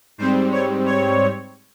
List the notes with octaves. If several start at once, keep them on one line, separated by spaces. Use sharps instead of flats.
G#2 G3 C4 C5
C#5
C#5